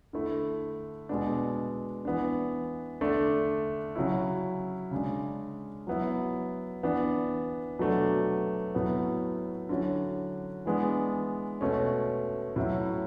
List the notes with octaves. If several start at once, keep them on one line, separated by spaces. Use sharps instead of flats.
D3 A3 E4
B2 G#3 B3 D4
E3 B3 D4
D3 A3 D4
C#3 F#3 C#4 E4
C#3 G#3 D4
F#3 B3 E4
E3 B3 D4
B2 F#3 A3 D4
A2 F#3 B3
D3 F#3 C#4 E4
E3 G#3 B3 D4
B2 A3 C#4
A2 F#3 C#4 E4